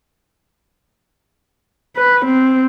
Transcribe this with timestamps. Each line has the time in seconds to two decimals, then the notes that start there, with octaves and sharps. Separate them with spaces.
1.96 B4
2.25 C4